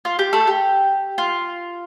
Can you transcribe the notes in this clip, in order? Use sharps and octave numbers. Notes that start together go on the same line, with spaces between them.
F4
G4
A3 A4
G4
F4